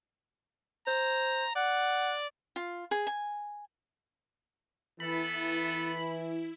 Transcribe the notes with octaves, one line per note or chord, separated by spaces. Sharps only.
C5 A#5
D5 F#5
F4
G#4
G#5
E3 B3 E4 A4 B5